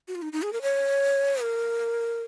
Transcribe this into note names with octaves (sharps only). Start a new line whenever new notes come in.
F#4
F4
D#4
D#4
G#4
A#4
C#5
A#4